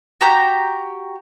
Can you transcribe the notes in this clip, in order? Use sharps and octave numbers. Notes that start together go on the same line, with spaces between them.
F#4 G4 A#5 G6